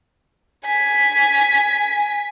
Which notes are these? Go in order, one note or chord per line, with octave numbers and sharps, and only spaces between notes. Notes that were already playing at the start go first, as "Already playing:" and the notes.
G#5 B6